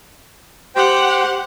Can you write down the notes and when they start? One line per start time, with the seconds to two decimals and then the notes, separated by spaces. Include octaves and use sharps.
0.76 G4 C5 F#5 G5